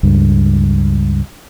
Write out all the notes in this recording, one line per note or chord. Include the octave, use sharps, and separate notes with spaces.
C#2 G2